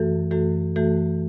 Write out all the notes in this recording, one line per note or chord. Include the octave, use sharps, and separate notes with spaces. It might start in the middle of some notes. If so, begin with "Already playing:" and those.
Already playing: F#2 E3 A3 F#4 A4
F#2 E3 A3 F#4 A4
F#2 E3 A3 F#4 A4